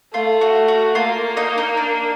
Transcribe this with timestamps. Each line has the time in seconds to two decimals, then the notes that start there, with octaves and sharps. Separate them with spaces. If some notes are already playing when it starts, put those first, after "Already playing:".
0.14 A3 F4
0.41 F#4
0.68 F#4
0.95 A#3 F4
1.37 D#4
1.58 D#4
1.77 D4